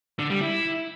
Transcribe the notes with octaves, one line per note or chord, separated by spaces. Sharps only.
D3
G3
E4